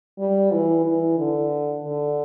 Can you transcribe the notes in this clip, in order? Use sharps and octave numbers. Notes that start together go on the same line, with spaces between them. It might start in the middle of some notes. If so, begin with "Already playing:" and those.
G3
E3
E3
D3
D3